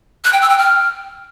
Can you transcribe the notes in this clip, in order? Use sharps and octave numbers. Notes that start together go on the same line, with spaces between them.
F#6
G5
E6
G5
F6